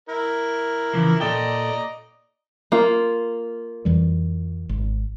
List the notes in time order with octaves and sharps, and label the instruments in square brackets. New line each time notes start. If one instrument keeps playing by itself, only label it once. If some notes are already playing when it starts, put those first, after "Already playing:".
[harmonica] E4 A#4
[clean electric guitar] C#3 E3 F3
[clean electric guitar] A#2 A4 G5 [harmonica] D5 D#5 A#5
[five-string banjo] A#3 F4
[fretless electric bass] F2 E3 G3
G#1